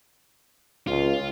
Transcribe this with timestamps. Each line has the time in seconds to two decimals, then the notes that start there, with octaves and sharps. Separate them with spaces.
0.87 C#2 F4